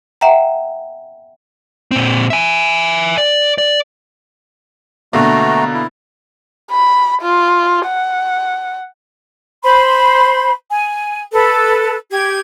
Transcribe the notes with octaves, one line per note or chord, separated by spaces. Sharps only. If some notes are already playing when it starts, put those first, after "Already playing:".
E5 F#5 G5 A#5
A#2 C4
E5 G#5
D5
D5
B2 D3 A3 A#3 F#4 A#5
E4
B5
F4
F#5
C5 B5 C6
G#5
A4 B4
G4 G#6